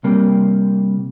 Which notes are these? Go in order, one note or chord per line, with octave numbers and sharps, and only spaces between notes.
C3 G3 A#3